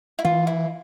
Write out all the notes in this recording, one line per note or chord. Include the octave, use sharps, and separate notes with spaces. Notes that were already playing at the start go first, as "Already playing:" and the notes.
E4
E3 F4
E4